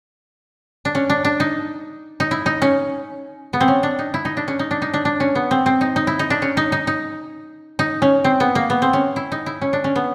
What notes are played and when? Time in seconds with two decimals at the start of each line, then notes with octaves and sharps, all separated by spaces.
0.85 D4
0.95 C#4
1.10 D4
1.25 D4
1.40 D#4
2.20 D#4
2.31 E4
2.46 D#4
2.62 C#4
3.53 B3
3.61 C4
3.68 C#4
3.83 D4
3.99 D#4
4.14 E4
4.25 D#4
4.37 D4
4.48 C#4
4.59 D#4
4.71 D4
4.82 D#4
4.94 D4
5.05 D4
5.20 C#4
5.35 B3
5.51 C4
5.66 C4
5.81 D#4
5.96 D#4
6.07 E4
6.19 D#4
6.30 D4
6.42 C#4
6.57 D#4
6.72 D#4
6.87 D#4
7.79 D#4
8.02 C#4
8.24 C4
8.40 B3
8.55 A#3
8.70 B3
8.82 C4
8.93 C#4
9.16 E4
9.32 D#4
9.46 E4
9.62 C#4
9.73 D4
9.84 C#4
9.96 B3